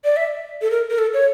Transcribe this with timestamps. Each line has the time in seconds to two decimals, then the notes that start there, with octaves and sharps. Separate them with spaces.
0.05 D5
0.17 E5
0.62 A4
0.71 A#4
0.90 A#4
0.98 A4
1.14 C#5